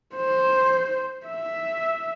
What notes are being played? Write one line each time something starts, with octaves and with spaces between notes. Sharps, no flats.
C5
E5